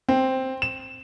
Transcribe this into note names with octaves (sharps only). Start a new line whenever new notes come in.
C4
E7